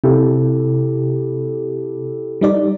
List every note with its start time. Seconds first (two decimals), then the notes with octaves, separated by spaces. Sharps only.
0.04 C3 E4 G4 A4
2.41 G3 D#4 D5